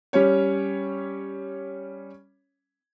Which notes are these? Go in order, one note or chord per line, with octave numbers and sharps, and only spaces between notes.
G3 C#4 C#5